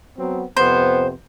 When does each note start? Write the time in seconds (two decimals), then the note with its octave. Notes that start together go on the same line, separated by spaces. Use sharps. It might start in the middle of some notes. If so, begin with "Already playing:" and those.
0.17 F#3 B3 C4
0.57 F2 C3 B3 C5